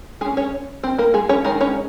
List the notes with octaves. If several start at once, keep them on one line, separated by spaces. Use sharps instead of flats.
G#3 C#4 G#4 G#5
C#4 C#5
C4 C5
A#3 A#4
G#3 G#4
C#4 C#5
D#3 G#3 A#4
C#4 C#5